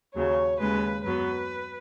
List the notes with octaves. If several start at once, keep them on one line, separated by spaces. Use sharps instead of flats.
D#2 C#3 F#3 C#5
D#2 C#3 G#3 C#4 B4
F#2 F#3 B3 B4